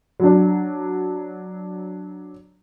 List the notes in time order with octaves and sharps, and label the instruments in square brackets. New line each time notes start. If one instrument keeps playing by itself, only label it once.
[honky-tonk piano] F#3 D4